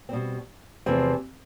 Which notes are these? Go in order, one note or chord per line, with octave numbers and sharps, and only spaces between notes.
B2 G3 C4
E2 C3 F3 A3 C4